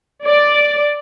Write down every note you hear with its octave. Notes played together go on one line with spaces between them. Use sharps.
D5